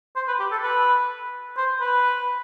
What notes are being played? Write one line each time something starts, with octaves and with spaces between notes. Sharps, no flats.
C5
B4
G4
A4
B4
C5
B4